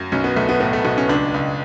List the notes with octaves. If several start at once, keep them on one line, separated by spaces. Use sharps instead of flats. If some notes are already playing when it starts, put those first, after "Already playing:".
Already playing: F#2
B1 C#4
B3
B1 A3
B3
A2 B3
A3
B1 B3
C#4
C#2 D4
C#2